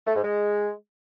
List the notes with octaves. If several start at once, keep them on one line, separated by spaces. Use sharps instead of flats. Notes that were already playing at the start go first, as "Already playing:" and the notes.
A3
G#2
G#3